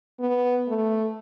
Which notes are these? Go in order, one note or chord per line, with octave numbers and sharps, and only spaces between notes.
B3
A3